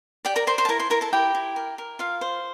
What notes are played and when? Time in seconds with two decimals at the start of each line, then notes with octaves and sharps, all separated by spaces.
0.25 G4 D5 G5
0.36 A#4 A#5
0.47 A#4 C5 C6
0.58 C5 C6
0.65 A5
0.69 E4 A#4 A#5
0.79 C5 C6
0.90 E4 A#4 A#5
1.01 A4 A5
1.13 E4 G4 G5
1.35 E4
1.56 A#4
1.78 A#4
1.99 F4 F5
2.21 C5